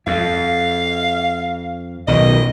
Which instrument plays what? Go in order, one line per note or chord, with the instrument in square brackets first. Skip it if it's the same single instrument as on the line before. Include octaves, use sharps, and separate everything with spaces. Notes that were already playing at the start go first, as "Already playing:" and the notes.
[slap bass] F2 [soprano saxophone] F5
[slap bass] B1 B2 D#3 [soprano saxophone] D#5